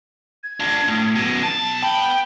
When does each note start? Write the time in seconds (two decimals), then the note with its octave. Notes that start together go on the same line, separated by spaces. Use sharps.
0.43 G#6
0.60 D4 F4
0.88 A2
1.16 F#2 B2
1.43 B1 A5
1.82 B3 G5 B5